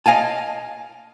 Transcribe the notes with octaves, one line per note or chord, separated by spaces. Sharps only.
D#5 F5 G#5 A5